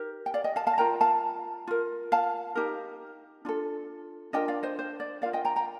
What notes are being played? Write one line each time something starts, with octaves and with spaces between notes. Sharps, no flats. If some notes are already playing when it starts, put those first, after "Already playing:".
Already playing: D#4 G4 A#4
G5
D5 F5
D#5 G5
F5 A5
F5 A5
F4 A#4 G5 A#5
F5 A5
F4 A#4
F5 A5
D#4 G4 A#4
D4 F4 A4
D4 F4 A#4 D#5 G5
D5 F5
C5 D#5
C5
D5
F4 A#4 D5 F5
D#5 G5
G5 A#5
G5 A#5